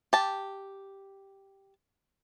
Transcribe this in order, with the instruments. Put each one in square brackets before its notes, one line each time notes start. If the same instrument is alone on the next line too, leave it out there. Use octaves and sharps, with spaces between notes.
[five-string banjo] G4 A5